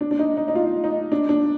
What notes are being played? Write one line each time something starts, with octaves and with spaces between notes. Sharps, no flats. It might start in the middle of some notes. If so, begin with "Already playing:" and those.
D4
D4
D#4
D#4
D#4
F4
D#4
D4
D4